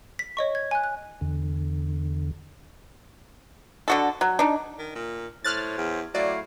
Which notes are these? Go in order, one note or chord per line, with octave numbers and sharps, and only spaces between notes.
B6
C#5 D#5 C#6
G#6
G#5 F#6
F#6
E2 D3
D3 F#4 A4
F#3
D4 D#4
D#3
A#2
A2 C5 C#5 F6 F#6 A6
E2
F#3 A3 E4 D5 F5